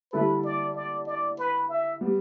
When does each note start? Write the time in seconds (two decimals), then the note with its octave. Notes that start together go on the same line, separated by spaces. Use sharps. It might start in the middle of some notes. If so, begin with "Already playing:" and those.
0.12 D3 G3 E4 A4 B4
0.44 D5
0.75 D5
1.07 D5
1.38 B4
1.69 E5
2.01 G3 B3